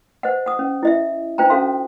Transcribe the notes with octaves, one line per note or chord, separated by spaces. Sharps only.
C5 D#5 F#5
F#5 D#6
C#4
E4 D#5 E5
D4 F4 C5 G5 A#5
C#4 F#4 A4 F5 C6